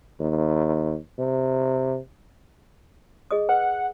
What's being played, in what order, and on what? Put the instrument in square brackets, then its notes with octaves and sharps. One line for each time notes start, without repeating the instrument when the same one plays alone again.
[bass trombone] D#2
C3
[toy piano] G#4 D#5 D#6
[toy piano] B4 [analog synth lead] F#5